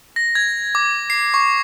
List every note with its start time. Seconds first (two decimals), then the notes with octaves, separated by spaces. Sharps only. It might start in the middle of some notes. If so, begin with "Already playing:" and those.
0.16 A#6
0.35 G#6
0.75 D6
1.10 C7
1.34 C#6